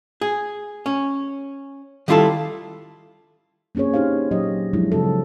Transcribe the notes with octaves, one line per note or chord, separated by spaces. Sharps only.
G#4
C#4
D#3 G3 E4 F4 G#4 A4
A#3 C4 C#4 G#4 C#5
D4 D#4 G4 C5 F5
A#2 F#3 G4 D#5
F3 F#3 G#3 D4 E4
C#3 C4 F#4 A4